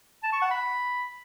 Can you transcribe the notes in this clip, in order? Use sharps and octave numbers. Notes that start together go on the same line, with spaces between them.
A5
C#6
F#5
B5